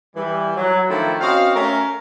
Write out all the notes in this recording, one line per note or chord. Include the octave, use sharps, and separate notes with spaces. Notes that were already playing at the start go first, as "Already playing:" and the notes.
E3 G3
F#3
D#3 F3 A3 D4 E4 F4
C4 C#4 F#4 D#5 F5
A3 C#4 A#4